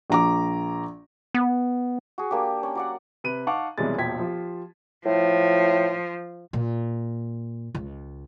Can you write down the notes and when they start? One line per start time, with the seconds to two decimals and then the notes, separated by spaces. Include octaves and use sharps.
0.10 A#1 A#5 D6
1.34 B3
2.18 F#4 G#4
2.31 A#3 D4 G4
2.63 C#4
2.75 F#3 D5 F#5
3.24 C3 B4 D#7
3.47 D#4 F5 F#5 A5 C#6 D6
3.78 B1 C3 E3 G3 G#3 A6
3.98 E1 A#1 F4 G5 G#6 B6
4.19 F3 F4 G4
5.06 A2 F3
6.53 A#2
7.75 C#2